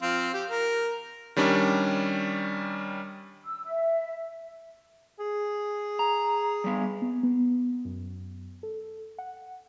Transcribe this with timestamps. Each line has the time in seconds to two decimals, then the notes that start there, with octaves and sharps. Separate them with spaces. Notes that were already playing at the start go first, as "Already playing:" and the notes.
0.02 F3 C4 F5
0.33 G4
0.49 A#4
1.36 D#3 G3 C#4 D4
3.46 E6
3.65 E5
5.19 G#4
5.99 A#5
6.64 G3 B3
7.02 B3
7.23 B3
7.85 F#2
8.63 A4
9.18 F#5